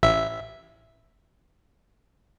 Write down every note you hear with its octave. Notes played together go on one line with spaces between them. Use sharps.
A1 E5